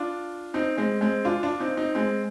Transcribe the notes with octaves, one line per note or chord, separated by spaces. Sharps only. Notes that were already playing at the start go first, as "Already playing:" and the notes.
Already playing: D4 F4
C4 D#4
G#3 C4
G#3 C4
D4 F4
D4 F4
C4 D#4
C4 D#4
G#3 C4